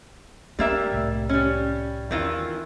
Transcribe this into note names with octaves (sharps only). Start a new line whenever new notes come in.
G3 A#3 B3 D4 E5
C2 A2
G3 C#4
E2 D#3 E3 F4